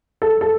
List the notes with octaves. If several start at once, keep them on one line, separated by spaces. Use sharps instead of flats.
A4
A4